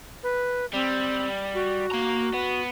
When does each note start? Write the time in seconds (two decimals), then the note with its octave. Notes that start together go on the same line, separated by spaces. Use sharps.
0.23 B4
0.74 G3 C4
1.54 F#4
1.92 A#3 A#5
2.34 B3